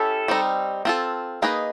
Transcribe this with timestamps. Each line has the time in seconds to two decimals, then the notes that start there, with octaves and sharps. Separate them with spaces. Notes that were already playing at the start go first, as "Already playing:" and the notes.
Already playing: C#4 E4 G4 A4
0.28 G3 C4 D#4
0.85 C4 F4 A4
1.42 A#3 D#4 G#4 B4 D#5